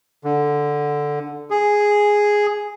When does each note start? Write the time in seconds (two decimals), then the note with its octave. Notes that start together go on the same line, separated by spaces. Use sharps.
0.24 D3
1.50 G#4